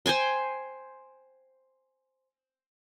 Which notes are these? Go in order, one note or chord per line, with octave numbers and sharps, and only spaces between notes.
C5 G5 G#5 C6